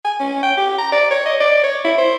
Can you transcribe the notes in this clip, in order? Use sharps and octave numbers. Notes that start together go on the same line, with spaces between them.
G#5
C#4
G5
G4
A#5
D5
C#5
D#5
D5
C#5
E4
C5